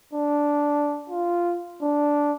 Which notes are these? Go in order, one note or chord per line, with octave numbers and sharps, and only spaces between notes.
D4
F4
D4